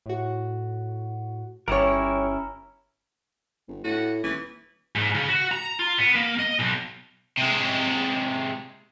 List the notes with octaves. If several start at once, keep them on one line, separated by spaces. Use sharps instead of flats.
A2 F#4
G1 G3 C#4 E4 A#4 C#5
G1
A2 F#4
D#1 E3
G#2
C#3
F#4
A#5
F4
B3
A#3
D#5
B1
C3 G#3